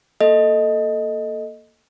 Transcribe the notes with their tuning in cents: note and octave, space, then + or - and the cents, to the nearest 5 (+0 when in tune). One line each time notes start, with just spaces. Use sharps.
A#3 +0 A4 +0 D#5 +0